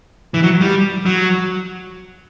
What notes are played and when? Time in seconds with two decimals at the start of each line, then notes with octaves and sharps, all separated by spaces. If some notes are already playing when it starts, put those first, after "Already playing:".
0.34 E3
0.43 F#3
0.61 G3
1.06 F#3